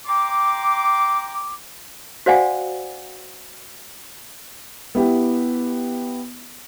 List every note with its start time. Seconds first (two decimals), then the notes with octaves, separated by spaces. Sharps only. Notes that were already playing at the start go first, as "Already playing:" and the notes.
0.07 G5 A#5 C6 D6
2.26 F#4 C5 D5 F5 F#5 G#5
4.95 B3 E4 G4